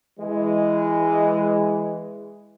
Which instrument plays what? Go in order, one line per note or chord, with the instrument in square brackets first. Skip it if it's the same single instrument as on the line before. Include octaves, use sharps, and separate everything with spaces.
[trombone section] E3 G#3